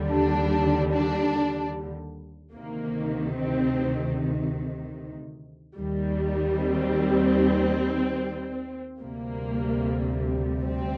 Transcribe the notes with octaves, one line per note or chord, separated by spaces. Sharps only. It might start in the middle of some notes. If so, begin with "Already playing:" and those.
Already playing: D#2 D3 G3
D4
D4
D2 C3 D#3 A#3
C4
D#2 D#3 G3
C4
D2 C3 G3 A#3
C4